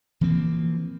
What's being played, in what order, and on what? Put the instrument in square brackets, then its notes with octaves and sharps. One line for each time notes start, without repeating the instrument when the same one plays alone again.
[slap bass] E3 F3 A#3 C4